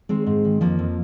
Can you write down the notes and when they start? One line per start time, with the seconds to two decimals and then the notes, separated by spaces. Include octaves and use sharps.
0.09 D#3 G#3 C4
0.26 G#2
0.45 D#3
0.61 F2 F3 A#3
0.79 F2